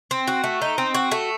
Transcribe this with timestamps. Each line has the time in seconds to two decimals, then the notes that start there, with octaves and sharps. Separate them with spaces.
0.11 C4
0.28 F#4
0.44 A3
0.62 D#4
0.78 C4
0.94 F#4
1.11 A3